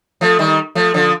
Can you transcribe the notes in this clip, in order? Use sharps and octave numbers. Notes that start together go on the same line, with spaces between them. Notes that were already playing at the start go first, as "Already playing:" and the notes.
F3 A3
D#3 G3
F3 A3
D3 F3